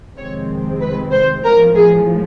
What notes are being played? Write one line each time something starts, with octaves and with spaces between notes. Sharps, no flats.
F2 C3 D#3 G#3 C4 C#5
B4
C5
B1 A2 F3 A#4
G#4